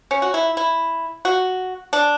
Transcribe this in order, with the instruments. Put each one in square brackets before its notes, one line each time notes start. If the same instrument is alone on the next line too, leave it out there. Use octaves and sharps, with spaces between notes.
[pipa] C#4
F#4
E4
E4
F#4
D4